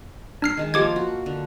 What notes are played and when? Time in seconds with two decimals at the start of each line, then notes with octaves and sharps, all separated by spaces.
0.42 D4 F6 C7
0.57 D#3 G#3 A5
0.74 F3 A#3 F4 G4 D6 G#6
0.96 F#4
1.26 D3